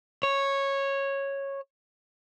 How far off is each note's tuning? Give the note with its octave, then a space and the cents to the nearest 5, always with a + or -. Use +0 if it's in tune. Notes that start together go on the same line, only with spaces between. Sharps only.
C#5 -10